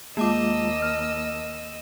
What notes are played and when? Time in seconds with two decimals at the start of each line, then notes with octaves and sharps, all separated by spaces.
0.17 D#2 G#3 A#3 F4 D#5 A5 D6 E6
0.82 F6